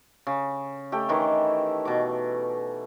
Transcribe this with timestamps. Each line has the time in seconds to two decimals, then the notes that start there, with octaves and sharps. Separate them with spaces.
0.27 C#3
0.92 A3 G4
1.09 D#3 E3 E4
1.85 B2 D6